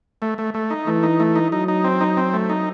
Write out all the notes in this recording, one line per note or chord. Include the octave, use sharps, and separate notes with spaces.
A3
A3
A3
D#4
E3 A3
D#4
A3
D#4
F#3 D#4
D#4
C4
D#4
C4
A3
D#4